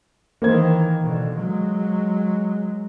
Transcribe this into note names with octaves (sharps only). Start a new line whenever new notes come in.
D#3 E3 A#3 C5 G#6
B2 D3
F#3 G#3